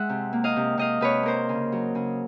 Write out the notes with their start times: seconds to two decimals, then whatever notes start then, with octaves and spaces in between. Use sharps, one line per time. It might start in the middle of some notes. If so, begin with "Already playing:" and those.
Already playing: G#3 E5 F#5
0.09 C3
0.33 A#3
0.44 D#5 F5
0.56 C3
0.77 C3 D#5 F5
1.01 C3 B4 C#5
1.23 A#3 A#4 C5
1.49 C#3
1.72 F#3
1.95 C#3